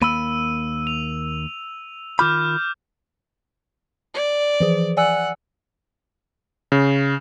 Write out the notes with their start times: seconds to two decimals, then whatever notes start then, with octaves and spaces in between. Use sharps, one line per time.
0.02 D#2 A#3 B5 E6 D#7
0.87 F7
2.19 D#3 F4 B5 D6 F6 G6
4.14 D5
4.60 E3 F3 G#4
4.97 D5 F#5 G#5 E6
6.72 C#3